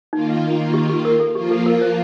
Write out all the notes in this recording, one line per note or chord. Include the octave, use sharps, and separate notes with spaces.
D#3 A#3 D#4 F4
G4
G4
A#4
A4
F3 A#3 F4 G4
A4
A#4
C5